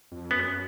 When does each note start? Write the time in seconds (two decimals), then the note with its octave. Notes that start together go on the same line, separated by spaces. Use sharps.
0.12 F2
0.31 F#2 B3